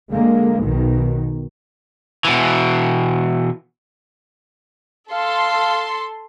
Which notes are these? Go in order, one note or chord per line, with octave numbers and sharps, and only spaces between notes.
D3 G#3 A#3
B1 B2 D#3
B2 E3
A4 F5 C6